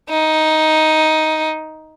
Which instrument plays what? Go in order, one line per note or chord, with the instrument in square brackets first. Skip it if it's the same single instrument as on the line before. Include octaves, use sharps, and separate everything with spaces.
[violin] D#4